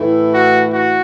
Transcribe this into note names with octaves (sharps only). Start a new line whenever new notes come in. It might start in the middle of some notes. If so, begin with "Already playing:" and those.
Already playing: A2 E3 A3 E4
F#4
F#4